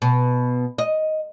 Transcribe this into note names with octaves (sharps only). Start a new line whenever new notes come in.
B2
D#5